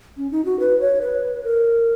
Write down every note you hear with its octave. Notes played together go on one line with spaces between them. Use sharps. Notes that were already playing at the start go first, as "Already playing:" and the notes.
C#4
D#4
F#4
B4
C#5
B4
A#4